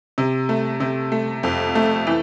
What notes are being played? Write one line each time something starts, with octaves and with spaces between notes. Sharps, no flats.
C3
A3
C3
A3
F2
A3
E3